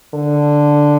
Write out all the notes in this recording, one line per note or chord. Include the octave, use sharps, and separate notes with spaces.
D3